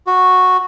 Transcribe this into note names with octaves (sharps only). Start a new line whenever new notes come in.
F#4